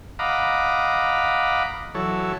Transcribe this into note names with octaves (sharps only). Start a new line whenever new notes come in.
D#5 F5 F#5 A#5 B5 D6
E3 F#3 A4 C#5